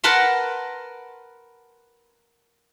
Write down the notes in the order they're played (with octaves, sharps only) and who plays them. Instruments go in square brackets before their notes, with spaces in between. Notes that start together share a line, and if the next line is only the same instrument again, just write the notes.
[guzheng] A#4 B4 F#5 A5 B5 C6